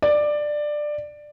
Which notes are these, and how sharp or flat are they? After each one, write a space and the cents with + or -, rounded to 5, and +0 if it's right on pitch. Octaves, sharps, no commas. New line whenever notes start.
D5 +15